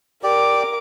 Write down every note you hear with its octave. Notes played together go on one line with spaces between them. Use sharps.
G4 A#4 D5 D6